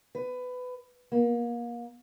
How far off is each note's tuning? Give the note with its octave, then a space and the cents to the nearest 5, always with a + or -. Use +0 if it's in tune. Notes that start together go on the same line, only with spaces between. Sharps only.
B4 +20
A#3 +30